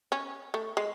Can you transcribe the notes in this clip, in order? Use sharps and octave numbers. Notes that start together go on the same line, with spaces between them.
C#4
A3
G#3